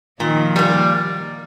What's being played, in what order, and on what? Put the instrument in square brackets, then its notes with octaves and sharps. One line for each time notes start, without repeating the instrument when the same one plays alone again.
[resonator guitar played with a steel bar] A#2 [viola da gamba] D#3 F3
[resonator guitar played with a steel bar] G3 A#3